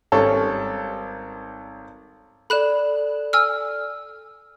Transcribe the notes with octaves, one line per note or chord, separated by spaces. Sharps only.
G#1 G3 C#4 A4 C#5 A5
A4 D5 B5 F#6 E7
G#5 E6 F6